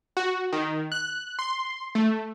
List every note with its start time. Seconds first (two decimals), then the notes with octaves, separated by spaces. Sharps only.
0.17 F#4
0.53 D#3
0.92 F#6
1.39 C6
1.95 A3